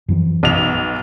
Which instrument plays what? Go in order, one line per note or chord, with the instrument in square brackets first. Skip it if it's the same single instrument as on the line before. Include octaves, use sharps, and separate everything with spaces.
[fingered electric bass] F#2 E3 F3
[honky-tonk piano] B1 F7